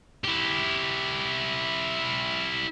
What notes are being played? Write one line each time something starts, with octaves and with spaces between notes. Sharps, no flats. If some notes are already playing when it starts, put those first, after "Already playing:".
E4 G4